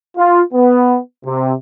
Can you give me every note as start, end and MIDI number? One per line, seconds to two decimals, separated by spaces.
0.17 0.41 65
0.53 0.98 59
1.25 1.52 48